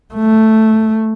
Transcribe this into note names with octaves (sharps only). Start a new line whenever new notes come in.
A3